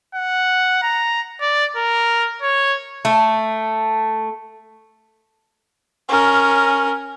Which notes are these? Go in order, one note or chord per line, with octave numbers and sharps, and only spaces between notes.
F#5
A#5
D5
A#4
C#5
A3
C#4 A#4